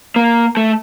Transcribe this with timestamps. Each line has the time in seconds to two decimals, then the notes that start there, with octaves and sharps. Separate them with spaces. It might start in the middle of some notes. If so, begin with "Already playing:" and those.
0.16 A#3
0.57 A3